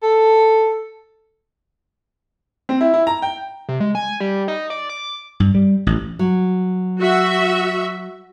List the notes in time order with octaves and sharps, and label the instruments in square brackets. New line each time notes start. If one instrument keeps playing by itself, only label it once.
[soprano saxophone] A4
[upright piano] C4
E4
E4
A#5
G5
[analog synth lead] C3
G#3
G#5
G3
D#4
D5
D6
[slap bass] G2
G3
A1
[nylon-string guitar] F#3
[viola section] F#4 E5